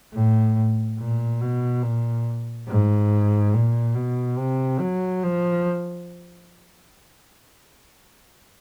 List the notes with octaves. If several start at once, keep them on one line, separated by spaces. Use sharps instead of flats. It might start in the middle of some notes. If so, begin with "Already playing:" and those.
A2
A#2
B2
A#2
G#2
A#2
B2
C3
F#3
F3